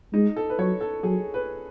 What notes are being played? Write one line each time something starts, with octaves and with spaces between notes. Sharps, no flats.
G#3 D#4
A4
B4
F#3 C#5
A4
F#3 G#4
B4